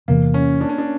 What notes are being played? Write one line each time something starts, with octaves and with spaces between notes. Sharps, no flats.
E2 C3 E3 A#3
C#4
D4
C#4
D4